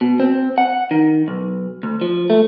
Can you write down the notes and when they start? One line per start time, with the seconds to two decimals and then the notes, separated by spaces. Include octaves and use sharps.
0.01 B2
0.20 C4
0.58 F#5
0.91 D#3
1.28 B1
1.83 D2
2.01 F3
2.30 A3